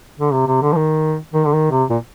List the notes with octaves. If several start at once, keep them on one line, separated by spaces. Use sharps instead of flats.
D3
C3
C3
D3
F3
D#3
D#3
D3
D#3
C3
A#2